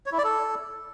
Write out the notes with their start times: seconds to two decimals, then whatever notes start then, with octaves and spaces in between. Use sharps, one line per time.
0.06 C#5
0.12 E4
0.18 D5
0.24 A4